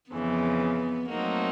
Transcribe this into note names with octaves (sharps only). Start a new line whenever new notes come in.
F2 C#3 E3 B3
F#3 A3 A#3 C4 D#4 F#4